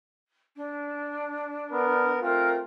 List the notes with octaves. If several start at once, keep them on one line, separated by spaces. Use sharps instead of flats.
D4
B3 A#4
A3 C4 F4 A#4